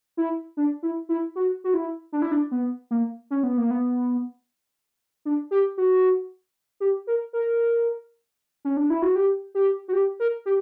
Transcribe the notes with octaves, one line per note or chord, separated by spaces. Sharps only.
E4
D4
E4
E4
F#4
F#4
E4
D4
E4
D4
B3
A#3
C#4
B3
A#3
B3
D4
G4
F#4
G4
A#4
A#4
C#4
D4
E4
F#4
G4
G4
F#4
G4
A#4
G4